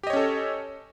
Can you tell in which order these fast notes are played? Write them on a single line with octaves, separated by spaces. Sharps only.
G4 D#5 C#5 C#4 A4